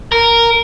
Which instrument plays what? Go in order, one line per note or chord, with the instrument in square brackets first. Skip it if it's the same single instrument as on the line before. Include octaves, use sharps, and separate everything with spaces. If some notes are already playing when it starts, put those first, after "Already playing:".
[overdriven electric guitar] A#4